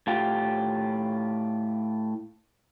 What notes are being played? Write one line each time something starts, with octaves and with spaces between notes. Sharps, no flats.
A2 F4 G4